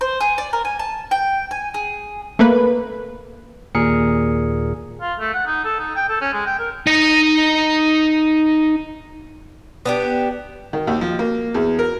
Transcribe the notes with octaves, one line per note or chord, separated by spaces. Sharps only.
C5
G#4
D5
A#4
G#5
A5
G5
G#5
G#4
A3 A#3 B4
D#2 A#2 G#4 A#4 C#7
F4
A3
F#5
D#4
A4
D#4
G5
A4
C#4
G#3
G5
A#4
D#4 D#5
B3 D4 G4
D#3
D#2
F3
A#3
E2
A#4